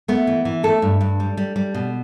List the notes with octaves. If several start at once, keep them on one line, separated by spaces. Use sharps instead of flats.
A3 B3
E3
E3
A3 A4
G2
G2
G3
G3
G3
B2